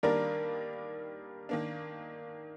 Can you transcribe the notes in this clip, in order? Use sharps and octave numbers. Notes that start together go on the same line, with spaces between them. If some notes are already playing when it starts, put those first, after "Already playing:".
D#3 G3 A#3 D4 A#4 D5
D#3 A#3 D4